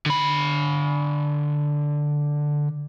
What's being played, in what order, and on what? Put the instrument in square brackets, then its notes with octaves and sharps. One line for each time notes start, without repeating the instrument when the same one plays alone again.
[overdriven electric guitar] D3 B5